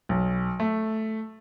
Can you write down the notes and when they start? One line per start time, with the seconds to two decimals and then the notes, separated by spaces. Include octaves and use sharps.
0.09 B1
0.60 A3